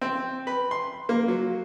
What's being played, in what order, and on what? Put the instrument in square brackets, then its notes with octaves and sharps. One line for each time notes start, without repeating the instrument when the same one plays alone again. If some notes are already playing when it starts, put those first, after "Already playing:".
[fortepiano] C4
B4
C6
A#3
F#3